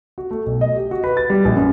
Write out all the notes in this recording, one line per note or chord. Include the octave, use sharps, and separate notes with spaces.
F#4
A3
B1
D#5
G4
F#4
B4
A6
G3
A#1
F#2